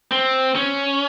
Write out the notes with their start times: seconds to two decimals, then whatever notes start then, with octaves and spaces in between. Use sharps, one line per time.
0.11 C4
0.55 C#4